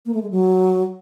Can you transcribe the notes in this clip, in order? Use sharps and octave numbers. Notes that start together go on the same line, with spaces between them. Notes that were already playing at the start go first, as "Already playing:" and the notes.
A#3
A3
G#3
F#3